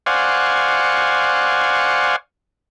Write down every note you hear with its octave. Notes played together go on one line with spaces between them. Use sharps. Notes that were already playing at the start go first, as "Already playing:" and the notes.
C5 D5 F5 F#5 G#5 C#6